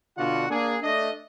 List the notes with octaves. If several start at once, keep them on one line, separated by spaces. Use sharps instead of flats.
B2 D3 D4 F4 F#4 F#5
A#3 D4 G#4
A3 D4 D#5